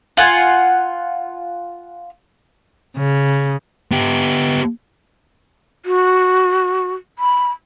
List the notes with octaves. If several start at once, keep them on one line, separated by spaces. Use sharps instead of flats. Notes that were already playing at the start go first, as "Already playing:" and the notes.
F4 F#5 G#5
C#3
B3 G4
F#4
B5